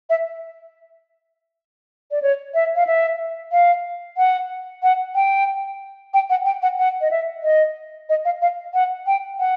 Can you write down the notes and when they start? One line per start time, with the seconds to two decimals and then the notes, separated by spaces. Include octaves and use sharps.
0.10 E5
2.11 D5
2.22 C#5
2.54 E5
2.76 F5
2.87 E5
3.52 F5
4.17 F#5
4.83 F#5
5.15 G5
6.14 G5
6.30 F#5
6.45 G5
6.62 F#5
6.78 F#5
7.01 D#5
7.11 E5
7.43 D#5
8.09 D#5
8.25 F5
8.42 F5
8.74 F#5
9.07 G5
9.39 F#5